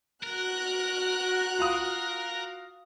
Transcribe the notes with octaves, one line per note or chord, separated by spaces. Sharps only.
F#4 A#4 F#6
F4 F5 D#6